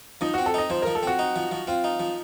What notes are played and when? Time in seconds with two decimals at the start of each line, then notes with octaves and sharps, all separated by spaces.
0.21 F3 D#4
0.34 C4 F#4
0.46 A4
0.54 D#4 D#5
0.70 F3 C5
0.82 F3 A#4
0.95 A4
1.03 C4 F#4
1.19 D#4
1.36 F3
1.51 F3
1.67 C4 F4
1.84 D#4
2.00 F3